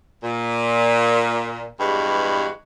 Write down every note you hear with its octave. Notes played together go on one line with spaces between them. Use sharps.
A#2
E2 G2 G3 G#3 F#4 B4